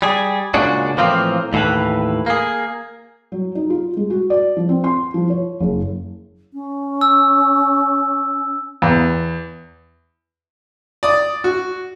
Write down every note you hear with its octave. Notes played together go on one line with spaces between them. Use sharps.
G3 G#4
A#2 C#3 G#3 D4 F#4
A2 E3 F3 A#3 C4 F4
D#2 A2 E3 B4
A#3 G#4
F#3
D#4
F4
G#3
F#4
D5
F3
C4
C6
F3
C#5
F#1
C#4
E6
E2
D5 D#6
F#4